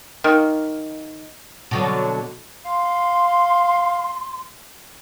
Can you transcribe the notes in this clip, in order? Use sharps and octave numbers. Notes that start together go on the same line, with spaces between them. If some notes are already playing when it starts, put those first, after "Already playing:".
D#3 A#3
B2 D3 F#3
F5 C6